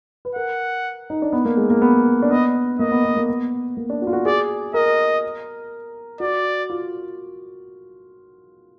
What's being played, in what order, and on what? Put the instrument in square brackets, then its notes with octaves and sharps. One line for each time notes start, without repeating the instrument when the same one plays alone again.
[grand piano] B4
[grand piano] A#4 [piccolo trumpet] F#5
[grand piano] D#4
D4
B3
A#3
G#3
A#3
B3
D4
[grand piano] B3 [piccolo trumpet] D#5
[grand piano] A#3 [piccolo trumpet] D#5
[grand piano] B3
B3
A#3
B3
A#3
D4
F#4
F4
F#4
[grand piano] G#4 [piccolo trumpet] D5
[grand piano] A#4 [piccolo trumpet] D#5
[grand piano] F#4 [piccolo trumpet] D5
[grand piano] F4